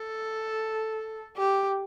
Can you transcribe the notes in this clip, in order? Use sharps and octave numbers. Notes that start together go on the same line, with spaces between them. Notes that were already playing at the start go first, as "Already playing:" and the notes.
Already playing: A4
G4